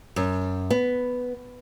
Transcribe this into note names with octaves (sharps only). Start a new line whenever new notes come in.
F#2
B3